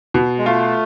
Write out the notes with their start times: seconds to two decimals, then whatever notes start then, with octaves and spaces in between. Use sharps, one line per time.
0.14 B2
0.38 G#3
0.46 A3 F4